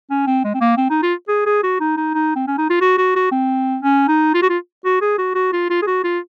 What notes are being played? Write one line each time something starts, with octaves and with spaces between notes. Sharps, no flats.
C#4
C4
G#3
C4
A#3
C4
D#4
F4
G#4
G#4
F#4
D#4
D#4
D#4
C4
C#4
D#4
F4
F#4
F#4
F#4
C4
C#4
D#4
F4
F#4
F4
F#4
G#4
F#4
F#4
F4
F4
G#4
F#4
F4